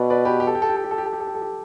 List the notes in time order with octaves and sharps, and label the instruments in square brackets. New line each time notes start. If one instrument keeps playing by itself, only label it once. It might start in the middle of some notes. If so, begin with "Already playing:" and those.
Already playing: [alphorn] B2 [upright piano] B4 D5
[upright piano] B4 D5
G4 B4
G4
A4
G4
A4
G4
A4
G4
A4
G4
A4
G4
A4
G4
A4
G4